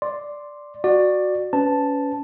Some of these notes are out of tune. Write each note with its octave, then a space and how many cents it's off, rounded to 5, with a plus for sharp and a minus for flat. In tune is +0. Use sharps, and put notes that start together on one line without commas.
D5 +0 C6 +0
F#4 -5 D5 +15
C#4 +25 B4 +20 A5 +0